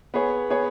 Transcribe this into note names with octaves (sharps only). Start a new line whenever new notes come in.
B3 G#4 C#5
B3 G#4 C#5